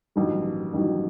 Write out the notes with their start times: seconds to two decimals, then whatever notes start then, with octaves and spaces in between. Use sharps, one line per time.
0.16 A1 G2 D#3 F#3
0.73 A1 G2 D#3 F#3